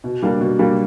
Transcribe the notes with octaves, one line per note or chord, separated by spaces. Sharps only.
B2
G3 A#3 D4
B2
G3 A#3 D4